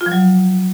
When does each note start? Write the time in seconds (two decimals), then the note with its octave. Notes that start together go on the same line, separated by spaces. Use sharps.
0.01 F4
0.06 F3
0.12 F#3